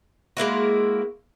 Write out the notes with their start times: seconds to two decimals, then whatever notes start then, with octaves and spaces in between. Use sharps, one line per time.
0.37 G#3 A#3 E4 F#4